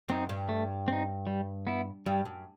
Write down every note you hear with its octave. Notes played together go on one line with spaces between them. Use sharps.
F#2 C4 D#4
G2
A3
C4 D#4
G3
B3 E4
G2 G3
F#2